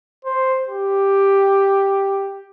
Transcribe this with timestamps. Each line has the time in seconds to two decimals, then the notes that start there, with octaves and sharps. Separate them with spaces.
0.25 C5
0.68 G4